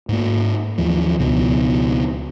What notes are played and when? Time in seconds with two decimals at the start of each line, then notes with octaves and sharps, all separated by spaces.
0.09 G#2 A#3
0.78 D#2 E3 F3
1.19 C#2 B2 F3